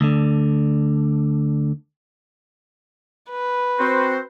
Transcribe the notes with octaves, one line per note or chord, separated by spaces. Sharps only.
D2 D3
B4
C4 F#4 C5